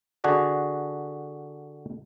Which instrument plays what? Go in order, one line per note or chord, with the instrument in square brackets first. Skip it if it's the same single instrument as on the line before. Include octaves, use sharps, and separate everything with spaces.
[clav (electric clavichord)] D3 D4 F#4 G#4 D5